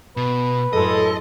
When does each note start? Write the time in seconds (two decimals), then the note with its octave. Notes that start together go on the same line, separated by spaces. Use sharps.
0.17 B2 B4
0.73 F#2 A2 G#3 A4 D#5